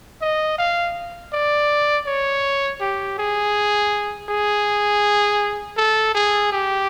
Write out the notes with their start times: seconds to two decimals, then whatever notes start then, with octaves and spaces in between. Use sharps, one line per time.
0.22 D#5
0.58 F5
1.33 D5
2.07 C#5
2.81 G4
3.18 G#4
4.30 G#4
5.77 A4
6.15 G#4
6.52 G4